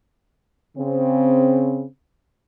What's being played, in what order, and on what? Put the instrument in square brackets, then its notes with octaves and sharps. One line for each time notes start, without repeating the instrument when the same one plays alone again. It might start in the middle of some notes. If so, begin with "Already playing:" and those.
[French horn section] C#3 C4